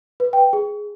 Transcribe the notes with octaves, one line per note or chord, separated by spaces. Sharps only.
B4
G5
G#4